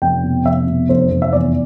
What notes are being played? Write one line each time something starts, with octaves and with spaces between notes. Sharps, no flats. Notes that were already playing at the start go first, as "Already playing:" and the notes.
F1 G5
B2
F1 E5
B2
F1 C5
F1
E5
E2 D5